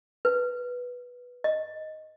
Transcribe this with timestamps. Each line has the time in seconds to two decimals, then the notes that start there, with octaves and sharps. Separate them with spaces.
0.25 B4
1.44 D#5